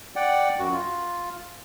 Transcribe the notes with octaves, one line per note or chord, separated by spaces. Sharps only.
D5 F#5 G5
F#2 F#4
F4